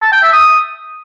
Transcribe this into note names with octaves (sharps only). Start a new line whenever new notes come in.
A5
G5
E5
D#6